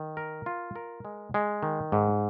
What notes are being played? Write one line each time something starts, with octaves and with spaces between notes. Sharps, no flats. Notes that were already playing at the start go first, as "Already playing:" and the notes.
Already playing: D#3
A#4
F4
A#4
G#3
G#3
D#3
G#2